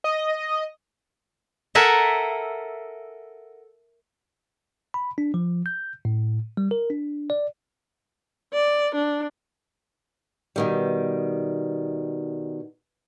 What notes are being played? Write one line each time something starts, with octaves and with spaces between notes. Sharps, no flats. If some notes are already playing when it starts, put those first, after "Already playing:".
D#5
A4 A#4 E5 F#5 G#5
B5
D4
F3
G6
A2
G3
A#4
D4
D5
D5
D4
B2 D#3 G3